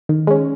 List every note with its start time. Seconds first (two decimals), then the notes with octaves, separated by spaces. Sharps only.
0.09 D#3
0.27 G#3 C#4